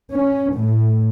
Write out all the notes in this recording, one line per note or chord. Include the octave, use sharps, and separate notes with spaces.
C#4
A2